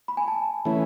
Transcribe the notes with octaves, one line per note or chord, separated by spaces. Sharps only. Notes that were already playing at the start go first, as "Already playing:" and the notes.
B5
G#5
A5
E3 A3 C#4 E4